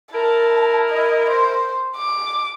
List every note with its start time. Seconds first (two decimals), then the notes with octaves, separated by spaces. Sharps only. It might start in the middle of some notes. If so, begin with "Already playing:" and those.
0.13 E4 A#4 A5
0.89 D#5
1.29 C5
1.96 D6